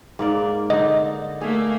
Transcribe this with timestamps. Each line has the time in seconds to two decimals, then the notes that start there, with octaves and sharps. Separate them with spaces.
0.19 G#2 A#3 D5
0.70 D3 D4 D#4 D#5
1.41 A3 A#3 G#4